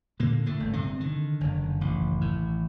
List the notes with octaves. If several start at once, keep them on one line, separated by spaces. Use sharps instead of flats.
A#2 D3 A#3
A2 A3
G1
C3 C4
D3 D#3
F#1
A1
A2